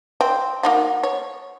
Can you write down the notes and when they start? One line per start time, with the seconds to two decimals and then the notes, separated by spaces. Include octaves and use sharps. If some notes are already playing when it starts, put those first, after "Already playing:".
0.21 C4
0.63 A#3 D#4 F#4
1.03 C#5